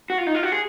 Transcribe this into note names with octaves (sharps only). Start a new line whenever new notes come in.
F#4
F4
D#4
F4
F#4
G#4